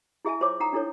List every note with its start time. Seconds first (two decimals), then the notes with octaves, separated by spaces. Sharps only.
0.25 E4 G#4 E5 G#5 A5
0.41 F4 C5 C#5 E5 D6
0.60 D#4 F#5 G5 A#5 D#6
0.73 D4 E4 A4 C#5